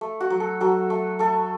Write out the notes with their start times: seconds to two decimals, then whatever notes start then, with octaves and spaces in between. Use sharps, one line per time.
0.01 A3
0.20 F#4
0.30 F#3
0.40 A4
0.61 F#3 A4
0.90 A3
1.19 A3 A4